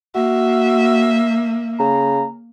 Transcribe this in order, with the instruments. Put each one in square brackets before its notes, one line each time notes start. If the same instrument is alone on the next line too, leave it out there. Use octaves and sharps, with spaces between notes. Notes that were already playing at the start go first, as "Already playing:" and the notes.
[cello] A#3 [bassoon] F#4 [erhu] E5
[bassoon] C#3 [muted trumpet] A#5